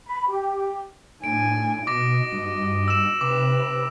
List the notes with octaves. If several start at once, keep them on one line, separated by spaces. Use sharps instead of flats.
B5
G4
A2 D4 G#5 D7
B2 F#4 D#5 D6 A#6
G2
E6 E7
C3 B4 D6